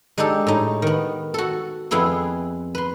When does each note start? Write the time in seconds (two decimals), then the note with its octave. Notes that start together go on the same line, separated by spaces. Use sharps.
0.18 G#3 D4 D#4 G4 A4
0.47 A2 D#4
0.82 D#3 B3
1.34 F#4 A4
1.91 F2 B3 E4 G#4 C6
2.75 B4 C6